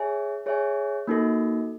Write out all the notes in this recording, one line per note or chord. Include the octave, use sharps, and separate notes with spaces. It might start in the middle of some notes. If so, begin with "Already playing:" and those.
Already playing: G#4 C#5 E5 G#5
G#4 C#5 E5 G#5
A#3 D#4 F#4 A4